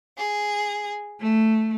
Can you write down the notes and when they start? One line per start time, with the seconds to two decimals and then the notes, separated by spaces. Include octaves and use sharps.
0.16 G#4
1.20 A3